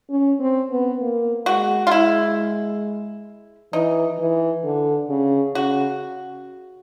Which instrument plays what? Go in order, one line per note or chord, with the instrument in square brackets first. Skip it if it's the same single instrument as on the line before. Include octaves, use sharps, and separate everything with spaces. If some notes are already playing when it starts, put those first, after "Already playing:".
[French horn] C#4
C4
B3
A#3
[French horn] G#3 [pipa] F#4
[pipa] F4
[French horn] G#3 [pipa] E4
[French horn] E3 [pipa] D#4
[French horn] E3
D3
C#3
[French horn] C#3 [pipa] F#4